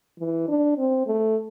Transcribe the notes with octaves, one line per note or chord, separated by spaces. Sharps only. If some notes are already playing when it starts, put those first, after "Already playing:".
E3
D4
C4
A3